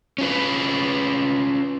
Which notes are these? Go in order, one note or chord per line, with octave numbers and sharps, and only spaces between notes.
C#4 F4 B4